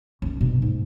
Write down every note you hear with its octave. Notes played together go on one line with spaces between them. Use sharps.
F#2
B2 D4
G#2